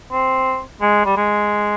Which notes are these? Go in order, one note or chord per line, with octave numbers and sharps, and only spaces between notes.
C4
G#3
G3
G#3